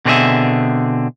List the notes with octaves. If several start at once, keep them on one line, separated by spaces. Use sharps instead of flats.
B2 D3 C4 F4 G#4 E5